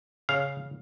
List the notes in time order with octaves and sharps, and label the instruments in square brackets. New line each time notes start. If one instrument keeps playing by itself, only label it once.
[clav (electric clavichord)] C#3 F5